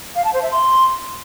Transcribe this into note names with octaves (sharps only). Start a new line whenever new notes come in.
F5
A5
C5
E5
C6